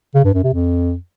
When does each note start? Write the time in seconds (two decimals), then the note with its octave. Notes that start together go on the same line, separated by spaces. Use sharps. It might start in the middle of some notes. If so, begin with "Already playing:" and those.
0.14 C#3
0.24 G2
0.34 F#2
0.44 C3
0.53 F2